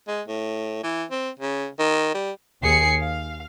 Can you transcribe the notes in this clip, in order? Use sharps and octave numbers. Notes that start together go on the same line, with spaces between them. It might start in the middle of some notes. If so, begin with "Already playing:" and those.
G#3
A2
E3
C4
C#3
D#3
G3
D#2 G#4 C7 C#7
F5